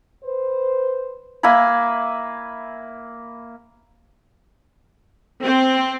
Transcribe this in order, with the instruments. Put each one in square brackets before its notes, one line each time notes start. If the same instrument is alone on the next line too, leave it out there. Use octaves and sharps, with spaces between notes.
[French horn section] B4 C5
[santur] A#3 E5 G#5 B5
[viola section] C4